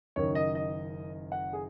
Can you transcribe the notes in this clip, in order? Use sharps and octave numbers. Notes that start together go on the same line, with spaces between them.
F#1 F#2 D#3 C#5
D#5
D#5
F#5
G#4